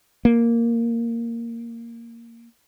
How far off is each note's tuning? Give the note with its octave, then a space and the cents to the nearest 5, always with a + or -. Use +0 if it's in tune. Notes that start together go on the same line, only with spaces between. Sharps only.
A#3 -5